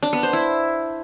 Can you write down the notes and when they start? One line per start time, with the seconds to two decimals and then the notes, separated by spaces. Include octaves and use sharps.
0.03 D4
0.13 B3
0.23 C5
0.33 E4